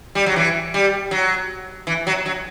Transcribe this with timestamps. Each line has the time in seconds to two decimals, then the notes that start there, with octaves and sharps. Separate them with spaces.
0.15 G3
0.26 F#3
0.36 E3
0.74 G3
1.11 F#3
1.87 E3
2.07 F#3
2.26 F#3